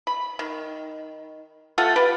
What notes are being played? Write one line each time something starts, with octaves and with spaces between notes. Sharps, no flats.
B5
D#3
A3 F4 A4 F#5
F4 G4 B4